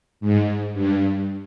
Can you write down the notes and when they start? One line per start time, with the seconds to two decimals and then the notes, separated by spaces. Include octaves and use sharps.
0.20 G#2
0.73 G2